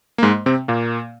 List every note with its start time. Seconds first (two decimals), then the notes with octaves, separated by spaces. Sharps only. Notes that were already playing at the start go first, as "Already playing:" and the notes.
0.18 A#3
0.23 G#2 G#3
0.46 C3 C4
0.68 A#2 A#3